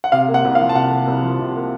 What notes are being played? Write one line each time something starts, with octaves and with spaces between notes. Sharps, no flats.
F#5
C3 F5
A#3
F#5
C2
F5
F3
A5
C3 F#5
A#3
C2
F3
C3
A#3